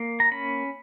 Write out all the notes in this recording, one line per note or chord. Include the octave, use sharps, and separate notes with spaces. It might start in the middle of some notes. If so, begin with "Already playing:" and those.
Already playing: A#3
A#5
C#4 B5